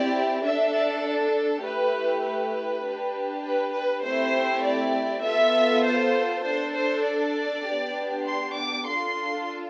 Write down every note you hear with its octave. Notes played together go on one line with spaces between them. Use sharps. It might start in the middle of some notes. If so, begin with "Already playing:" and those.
Already playing: C4 E4 G4 D5
D4 A4 E5
D5
A3 E4 G4 B4
B4
D4 G4
B4
B4
A3 C4 E4 G4 C5
D5
B3 F4 A4 E5
C5
D4 A4 C5
C5
D5
B3 D4 G4
C6
D6
D4 F4 A4 C6